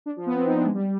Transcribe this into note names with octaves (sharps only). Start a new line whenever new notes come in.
D4
F3
B3
C4
D#4
D4
G#3
G3